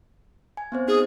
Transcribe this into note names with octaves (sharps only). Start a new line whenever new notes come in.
G#5
B3 C4 C5
D#4 G#4